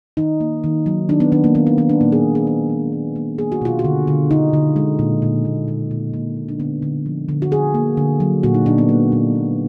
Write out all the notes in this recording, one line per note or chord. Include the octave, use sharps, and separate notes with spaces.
D#3 D#4
A#3
D#3
F#3
D#3 D4
B3
D#3 D4
A#3
D#3 B3
B3
D#3 B3
D4
A#2 A#3
G#4
A#2
G#4
A#2 G#4
G#3
A#3
A#3
A#3 G#4
F#4
B2 F4
F#4
D3
D3
D3 D#4
D3
G#3
A#2
A#2
A#2
A#2
A#2
A#2 A#3
A#2
D4
D3 B3
D3
F3
D3
F#4
D3 G#4
A#3
D3
F#3
A#2 F#4
D#4
A#2 D4
B3
G#3 A#3
A#2
A#2